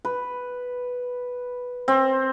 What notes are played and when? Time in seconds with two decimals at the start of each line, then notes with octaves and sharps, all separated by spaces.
0.05 B4
1.88 C4